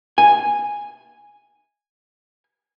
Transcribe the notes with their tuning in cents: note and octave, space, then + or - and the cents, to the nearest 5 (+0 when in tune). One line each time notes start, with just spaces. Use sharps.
G#5 -5